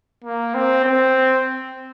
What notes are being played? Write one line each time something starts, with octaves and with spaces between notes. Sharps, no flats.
A#3
C4
C4